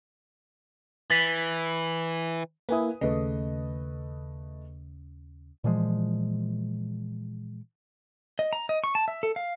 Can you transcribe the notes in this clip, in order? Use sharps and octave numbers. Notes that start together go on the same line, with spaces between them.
E3 A6 B6
A#3 E4 B4 G#5 D#6
D#2 C#3 A3 B4 D#5
A#2 E3 F3 G#3
D#5
A#5
D#5
C#6
A5
E5
A4
F5